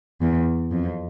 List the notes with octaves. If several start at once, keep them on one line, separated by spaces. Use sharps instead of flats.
E2
F2